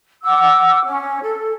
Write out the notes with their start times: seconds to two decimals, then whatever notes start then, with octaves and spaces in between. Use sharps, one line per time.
0.23 F#5 D6 E6
0.84 C#4
1.23 A4